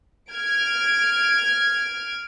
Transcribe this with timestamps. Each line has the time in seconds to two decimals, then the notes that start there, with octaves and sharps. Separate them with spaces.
0.32 F6 G#6 D7